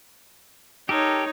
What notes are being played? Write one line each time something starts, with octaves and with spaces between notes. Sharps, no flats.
D#4 G4 A4 A#4 C#5